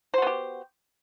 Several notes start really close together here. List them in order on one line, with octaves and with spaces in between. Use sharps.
C5 F#4 B3 G4